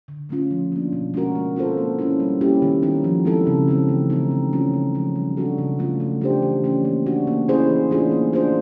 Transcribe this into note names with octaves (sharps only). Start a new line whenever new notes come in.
D3
F#3 A3 C#4 F4
F3
A#3 D4
B2
G#3 C#4 F#4 A#4
G#3
C4 F4 A4 C5
A#3
C#4 E4
G3
A#3 C#4 E4 G4
D#3
F#3 B3 D#4
F3
G#3 C4 E4 A4
C#3
E3 G#3 C4
A3
C4 D#4
C#3
F#3 A3 C#4 F4
C#3
F3 G#3
G3
B3 D4 F#4 A4
C#3
F#3 A3 C#4 F4
A3
D4 G4 C5
E3
A3 C#4
A#3
D4 F#4
A#3
C#4 E4 G#4 C5
E3
A3 D4 F4 G#4
A#3
D4 F4 G#4 C5